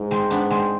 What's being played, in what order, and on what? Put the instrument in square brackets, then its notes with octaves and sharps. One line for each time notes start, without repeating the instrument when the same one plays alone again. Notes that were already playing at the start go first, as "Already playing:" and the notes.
Already playing: [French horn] G#2
[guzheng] G#3 C4
B3 D4
G#3 C4